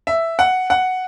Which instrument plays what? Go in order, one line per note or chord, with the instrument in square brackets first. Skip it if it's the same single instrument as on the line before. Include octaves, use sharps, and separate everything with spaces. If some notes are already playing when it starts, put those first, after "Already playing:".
[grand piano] E5
F#5
F#5